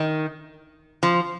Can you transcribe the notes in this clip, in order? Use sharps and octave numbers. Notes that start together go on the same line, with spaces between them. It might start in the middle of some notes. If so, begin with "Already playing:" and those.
Already playing: D#3
F3